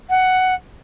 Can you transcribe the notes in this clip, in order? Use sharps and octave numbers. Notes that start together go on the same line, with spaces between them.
F#5